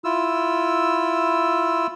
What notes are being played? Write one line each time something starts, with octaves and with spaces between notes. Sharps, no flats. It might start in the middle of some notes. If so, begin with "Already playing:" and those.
E4 F4 E6